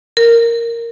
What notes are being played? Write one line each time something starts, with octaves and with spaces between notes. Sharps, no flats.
A#4